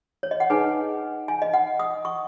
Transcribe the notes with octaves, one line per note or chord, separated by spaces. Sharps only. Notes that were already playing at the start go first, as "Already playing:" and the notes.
C#5
D#5
F#5
D#4 G#4 B4 G#5
G#5
D#5
F#5
D#6
C#6